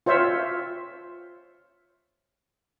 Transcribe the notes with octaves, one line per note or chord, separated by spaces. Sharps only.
F4 C5 C#5 E5